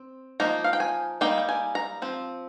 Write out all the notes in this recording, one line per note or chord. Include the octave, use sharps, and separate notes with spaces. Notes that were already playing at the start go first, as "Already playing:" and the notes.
Already playing: C4
F3 A#3 D#4 A#5
F5
G5
G#5
G3 A#3 D#4 G5
G5
G#5
A#5
F3 C4